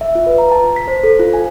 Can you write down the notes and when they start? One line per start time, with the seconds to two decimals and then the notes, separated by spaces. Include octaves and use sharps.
0.01 E5
0.15 F4
0.26 B4
0.38 A#5
0.52 A5
0.76 B6
0.88 C5
1.04 A4
1.20 F4
1.34 G#5